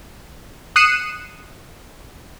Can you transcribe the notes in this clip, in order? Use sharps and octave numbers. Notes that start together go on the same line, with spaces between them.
D#6 F#6 C7 C#7 D#7 E7